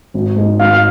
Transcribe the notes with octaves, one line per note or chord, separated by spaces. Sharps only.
G#1
G#2 G#3 D#4
G#1 F5
F5